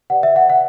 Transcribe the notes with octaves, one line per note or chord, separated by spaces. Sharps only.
G4 B4 D5 F#5
E5
F#5
F#5